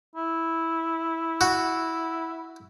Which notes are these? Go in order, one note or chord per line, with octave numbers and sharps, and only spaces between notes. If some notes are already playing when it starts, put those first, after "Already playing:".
E4
F#4